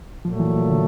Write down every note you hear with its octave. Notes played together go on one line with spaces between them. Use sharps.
A#2 F3 F#3 A3
E3
D3